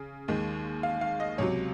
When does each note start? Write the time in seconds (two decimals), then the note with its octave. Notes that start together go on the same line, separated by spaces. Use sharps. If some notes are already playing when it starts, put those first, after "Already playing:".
Already playing: C#3
0.28 D#2 D#3 G#3
0.83 F5
1.01 F5
1.20 D#5
1.38 C#2 C3 F#3 C#5